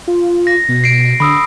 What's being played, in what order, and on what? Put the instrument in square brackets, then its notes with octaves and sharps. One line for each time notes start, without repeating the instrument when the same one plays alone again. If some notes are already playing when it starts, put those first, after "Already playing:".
[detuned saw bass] F4
[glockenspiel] A#6
[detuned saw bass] B2
[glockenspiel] C7 D7
[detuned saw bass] D3 [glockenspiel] B5 D#6 E6